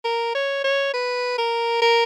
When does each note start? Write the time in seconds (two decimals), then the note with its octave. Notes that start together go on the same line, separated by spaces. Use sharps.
0.05 A#4
0.35 C#5
0.64 C#5
0.94 B4
1.38 A#4
1.82 A#4